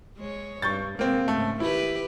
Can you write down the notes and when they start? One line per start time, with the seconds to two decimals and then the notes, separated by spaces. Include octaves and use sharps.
0.17 G#3 C#5
0.62 G2 C#6 G6 A6
0.99 C3 G#3 A#3 C4
1.28 G#2 C#3 A3
1.60 D#3 E4 G4 B4